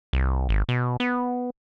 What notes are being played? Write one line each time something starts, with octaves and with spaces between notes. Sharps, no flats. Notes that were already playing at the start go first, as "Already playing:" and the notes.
C2
G#1
B2
B3